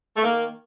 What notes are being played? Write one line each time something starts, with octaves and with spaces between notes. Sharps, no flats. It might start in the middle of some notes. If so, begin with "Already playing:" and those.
A3
D#3 A#3